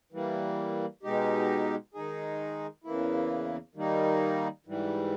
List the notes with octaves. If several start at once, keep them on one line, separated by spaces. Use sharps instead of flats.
E3 G3 A#3
B2 G#3 D#4 G4
D#3 G#3 D#4 G#4
E2 C#3 E3 A#3 E4
D#3 G3 A#3 D#4
G#2 E3 G3